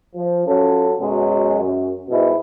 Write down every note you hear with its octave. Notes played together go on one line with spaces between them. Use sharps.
F3
F#3 C#4 F4 A4
F#2 B2 F#3 G#3
F#2
G#2 B2 G3 G#3 E4